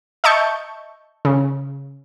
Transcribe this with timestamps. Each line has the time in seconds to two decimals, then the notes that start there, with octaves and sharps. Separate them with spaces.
0.24 D#5 E5 A5 C#6 G6
1.25 C#3